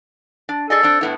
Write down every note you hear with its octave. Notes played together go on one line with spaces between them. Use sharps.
D4
G#4 A4 D5 D#5
C4 D4
A2 B3 E4